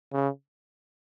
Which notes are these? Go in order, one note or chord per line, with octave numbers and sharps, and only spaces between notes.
C#3